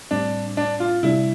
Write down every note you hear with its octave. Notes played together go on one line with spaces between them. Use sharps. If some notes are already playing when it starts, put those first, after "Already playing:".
A2 G3 C4 D4
D4
F4
C3 G3 D4 E4